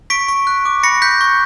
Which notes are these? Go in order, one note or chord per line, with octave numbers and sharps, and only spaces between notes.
C#6 B6 D7
C#6
F#6
D6
B5 A#6 C#7
F#6 G6 B6
C#6